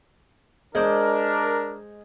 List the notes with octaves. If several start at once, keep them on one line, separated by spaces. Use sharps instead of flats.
G#3 D4 A#4 C5 D6